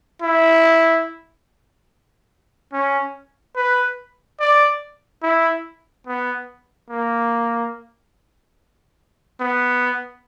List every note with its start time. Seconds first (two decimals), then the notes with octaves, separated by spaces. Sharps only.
0.22 E4
2.73 C#4
3.56 B4
4.40 D5
5.23 E4
6.07 B3
6.90 A#3
9.41 B3